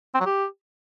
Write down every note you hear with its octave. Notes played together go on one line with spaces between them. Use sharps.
C4
F#3
G4